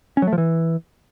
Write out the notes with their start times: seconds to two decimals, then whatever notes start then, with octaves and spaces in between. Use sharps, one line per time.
0.17 C#4
0.22 F#3
0.27 A3
0.33 F3
0.38 E3